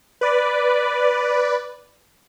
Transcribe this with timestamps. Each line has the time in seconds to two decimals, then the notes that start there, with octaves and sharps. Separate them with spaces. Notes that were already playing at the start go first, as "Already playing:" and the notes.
0.21 B4 D5